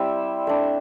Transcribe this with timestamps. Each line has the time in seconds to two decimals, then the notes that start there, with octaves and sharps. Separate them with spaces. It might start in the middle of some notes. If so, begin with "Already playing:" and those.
Already playing: G3 C4 E4 E5
0.47 A3 D4